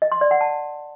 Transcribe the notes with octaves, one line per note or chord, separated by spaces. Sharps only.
D#5
C6
D5
F#5
A5